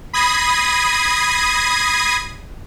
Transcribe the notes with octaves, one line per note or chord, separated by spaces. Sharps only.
B5 D#6 G#6 A#6 C7 D#7